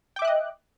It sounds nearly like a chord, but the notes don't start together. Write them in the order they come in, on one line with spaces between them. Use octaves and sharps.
G5 D6 E5 F#6 D#5